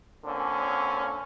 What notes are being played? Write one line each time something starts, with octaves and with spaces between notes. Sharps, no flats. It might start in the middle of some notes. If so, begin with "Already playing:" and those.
A#2 D3 A#3 C4 C#4